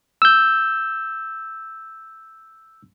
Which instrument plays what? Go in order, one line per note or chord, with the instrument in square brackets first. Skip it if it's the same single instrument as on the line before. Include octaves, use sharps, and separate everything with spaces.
[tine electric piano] E6 G6